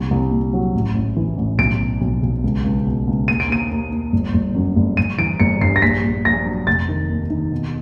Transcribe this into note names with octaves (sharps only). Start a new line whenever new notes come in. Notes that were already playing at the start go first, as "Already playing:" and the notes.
Already playing: C2 A#2
C2
A#2
F#3
A1
A1
E3
A1
B1 D7
B2
B1
B1
C#2
C#2
B2
C#2
D#2 D#7
D7
D#2 D#7
D#2
D#2
G1
G1
F#2
G1
G1 D#7
E3 D7
G1 C#7
G2 C7
A#6
A#1 B6
A#1
A#1 A#6
F#3
F1 A6
D#3
D#2
D#3
B2